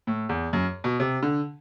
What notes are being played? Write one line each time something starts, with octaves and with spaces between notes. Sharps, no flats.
A2
E2
F#2
B2
C3
D3